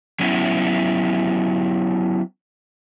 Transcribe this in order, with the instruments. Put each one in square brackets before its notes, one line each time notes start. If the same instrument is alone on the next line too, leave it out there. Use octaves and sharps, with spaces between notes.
[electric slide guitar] F#3 B3 C#4 E4